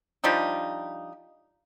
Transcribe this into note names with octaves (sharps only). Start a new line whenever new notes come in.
F3 G3 D4 D#4